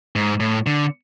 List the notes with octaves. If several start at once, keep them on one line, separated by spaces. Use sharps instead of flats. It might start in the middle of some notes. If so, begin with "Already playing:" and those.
G#2
A2
D3